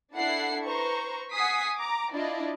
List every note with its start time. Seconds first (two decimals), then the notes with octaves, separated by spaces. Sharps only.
0.14 D4 E4 A4 F#5 C7
0.66 B4 C5 A#5 C#6
1.32 F#5 G#5 D#6 B6 C7
1.79 A#5 D6
2.14 D4 E4 F4 D5 D#5